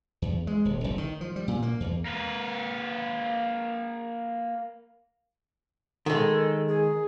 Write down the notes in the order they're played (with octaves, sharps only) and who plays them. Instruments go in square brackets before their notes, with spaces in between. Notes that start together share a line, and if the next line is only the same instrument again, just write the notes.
[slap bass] E2
G#3
D#1
F1
D#3
F3
G3
A#2
A#3
E2
[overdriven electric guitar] A#3 B4
[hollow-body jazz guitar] D#3 G#3 [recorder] A4
[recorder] G#4